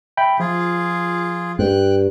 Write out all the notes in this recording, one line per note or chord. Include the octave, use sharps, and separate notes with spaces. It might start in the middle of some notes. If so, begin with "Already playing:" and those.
E5 G5 B5
F3 F4 G#4
G2 G5 F#6